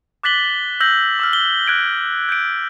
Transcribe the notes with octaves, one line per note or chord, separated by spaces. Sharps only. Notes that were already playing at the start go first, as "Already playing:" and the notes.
D6 F#6 A6 B6 F#7 G7
E6 G6 A#6 F#7
D6 E6 F6
G7
F#6 G#6 D7 G7
G6 D7